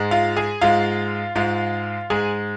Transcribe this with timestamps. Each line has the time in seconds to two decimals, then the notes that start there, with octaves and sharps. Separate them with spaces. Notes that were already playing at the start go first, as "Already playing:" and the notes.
Already playing: G#2 G#3
0.11 F4 F5
0.36 G#4 G#5
0.61 G#2 G#3 F4 F5
1.35 G#2 G#3 F4 F5
2.10 G#2 G#3 G#4 G#5